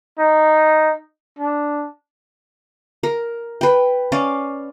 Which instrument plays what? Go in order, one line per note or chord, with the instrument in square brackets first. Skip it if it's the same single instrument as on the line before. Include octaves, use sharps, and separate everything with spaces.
[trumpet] D#4
D4
[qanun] A#4
B4 G5
C#4 D5 F5